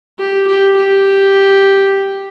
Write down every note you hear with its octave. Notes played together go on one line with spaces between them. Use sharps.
G4
G4
G4